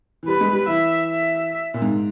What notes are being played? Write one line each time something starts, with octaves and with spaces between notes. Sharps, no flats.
E3
G3 B4
G#3
G3
E3 E5
E5
A#2
G#2